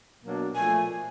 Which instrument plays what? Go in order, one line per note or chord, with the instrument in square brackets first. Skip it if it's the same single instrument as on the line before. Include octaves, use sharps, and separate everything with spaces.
[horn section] B2 F#3 A#3 D4
[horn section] A#2 F3 A3 [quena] G#5